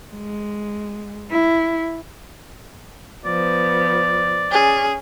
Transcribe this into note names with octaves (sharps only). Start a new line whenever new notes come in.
G#3
E4
F3 B3 D5
C#4 G#4